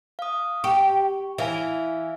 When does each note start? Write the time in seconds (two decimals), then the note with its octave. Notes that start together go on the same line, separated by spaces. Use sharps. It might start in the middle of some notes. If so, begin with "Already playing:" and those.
0.19 F5 D#6
0.64 G4 C#6
1.38 E3 E5 F5 G#5